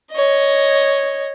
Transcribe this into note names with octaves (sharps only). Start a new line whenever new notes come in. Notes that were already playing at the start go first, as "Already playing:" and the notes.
C#5 D#5